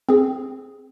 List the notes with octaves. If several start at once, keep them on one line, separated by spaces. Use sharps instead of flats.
C4 G#4